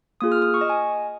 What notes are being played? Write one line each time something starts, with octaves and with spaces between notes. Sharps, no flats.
A#3 F4 G#4 D#6
F6
D#6
C#6
D#5
G#5